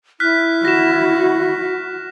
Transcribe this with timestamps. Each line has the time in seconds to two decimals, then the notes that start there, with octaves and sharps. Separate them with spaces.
0.20 E4 F6 F#6 B6
0.65 F#4 A#6 E7